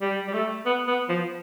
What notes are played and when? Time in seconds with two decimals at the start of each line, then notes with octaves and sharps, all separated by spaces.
0.01 G3
0.28 G3
0.33 A3
0.66 B3
0.87 B3
1.09 F3